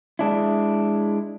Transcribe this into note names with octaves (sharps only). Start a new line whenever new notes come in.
G#3 D4 E4